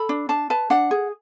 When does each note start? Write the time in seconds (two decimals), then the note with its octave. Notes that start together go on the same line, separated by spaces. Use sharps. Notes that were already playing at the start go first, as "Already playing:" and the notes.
Already playing: A4 B5
0.09 D4
0.29 D4 A5
0.50 B4 A5
0.70 D4 F#5
0.91 G#4